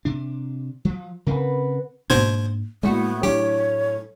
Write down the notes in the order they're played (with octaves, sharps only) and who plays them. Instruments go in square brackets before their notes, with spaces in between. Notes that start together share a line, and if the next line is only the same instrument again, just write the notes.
[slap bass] C3 D4
F3 F#3
[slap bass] C#3 C4 [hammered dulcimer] B4 F#5 B5
[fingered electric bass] G#2 A#3 D4 [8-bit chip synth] B2 C5 G#6
[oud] A2 E4 F#4 [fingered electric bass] G#3 A#3 [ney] B3
[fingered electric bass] F#3 D4 [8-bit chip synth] G4 [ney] C#5